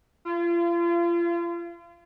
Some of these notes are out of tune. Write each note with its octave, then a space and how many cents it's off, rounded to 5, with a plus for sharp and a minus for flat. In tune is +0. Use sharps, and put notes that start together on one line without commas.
F4 -35